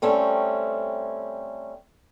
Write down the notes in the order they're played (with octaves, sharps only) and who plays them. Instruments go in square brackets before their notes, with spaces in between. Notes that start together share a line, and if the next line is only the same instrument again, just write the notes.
[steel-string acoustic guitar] G3 A3 C4 C#4